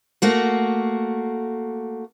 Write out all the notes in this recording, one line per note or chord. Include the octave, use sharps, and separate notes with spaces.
A3 A#3 F#4